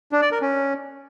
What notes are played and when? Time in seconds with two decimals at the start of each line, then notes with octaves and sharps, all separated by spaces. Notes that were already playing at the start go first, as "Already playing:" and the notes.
0.12 D4
0.22 D5
0.32 A#4
0.41 C#4